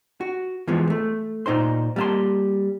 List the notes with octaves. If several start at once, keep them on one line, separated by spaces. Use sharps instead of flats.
F#4
E3 F3 G#3 B3
A3
A#2 D#4 C5 C6
G3 A#3 F5 A5 C6